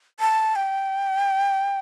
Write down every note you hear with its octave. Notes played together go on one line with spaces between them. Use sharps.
A5
G5